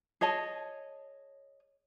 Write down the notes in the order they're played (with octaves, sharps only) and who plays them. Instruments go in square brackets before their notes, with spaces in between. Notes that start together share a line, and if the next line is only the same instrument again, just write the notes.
[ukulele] G#4 C#5 D#5 A5